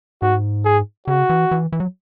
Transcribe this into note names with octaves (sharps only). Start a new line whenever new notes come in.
G#2 F#4
G#4
C#3 F#4
E3
E3
E3
F#3